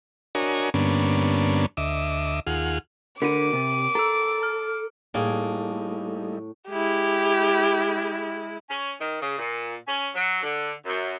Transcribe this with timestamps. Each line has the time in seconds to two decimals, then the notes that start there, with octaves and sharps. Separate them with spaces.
0.35 D4 F#4 A#4 C#5 D#5 G#5
0.74 G2 D3 A#3 B3 C#4 D4
1.77 D2 D#5 E5 D6
2.47 D#2 F4 G#4 F#5 F6
3.22 D3 F#4 A#4 D6 D#7
3.53 C3
3.95 A4 A#5 E6
4.43 F6
5.14 A2 G3 A3 A#3 D#4 G#4
6.69 G#3 E4 G4
8.69 C#4
9.00 D#3
9.22 C#3
9.39 A#2
9.87 C#4
10.15 F#3
10.43 D3
10.86 F#2